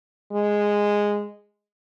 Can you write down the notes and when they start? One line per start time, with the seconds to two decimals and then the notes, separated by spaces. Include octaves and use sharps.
0.33 G#3